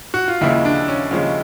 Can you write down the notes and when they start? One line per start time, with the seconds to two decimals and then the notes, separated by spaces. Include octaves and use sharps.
0.14 F#4
0.28 F4
0.41 D#2 C#3 F3 G#3 E4
0.65 D4
0.88 C#4
1.11 D#2 C#3 F3 G#3 C#4